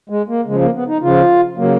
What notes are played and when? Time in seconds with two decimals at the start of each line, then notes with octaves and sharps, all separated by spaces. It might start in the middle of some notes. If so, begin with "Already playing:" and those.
0.09 G#3
0.28 A#3
0.46 C#3 F3 G#3
0.61 A#3
0.74 B3
0.88 D#4
1.02 C#3 F3 F4
1.57 C#3 F#3 A#3